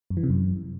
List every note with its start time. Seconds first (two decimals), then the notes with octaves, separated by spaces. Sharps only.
0.10 F#2
0.17 E3
0.23 C3
0.30 F#2